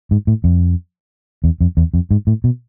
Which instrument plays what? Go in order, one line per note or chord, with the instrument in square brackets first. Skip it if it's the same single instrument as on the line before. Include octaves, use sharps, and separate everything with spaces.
[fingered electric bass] G#2
A2
F2
E2
F2
E2
F2
G#2
A2
B2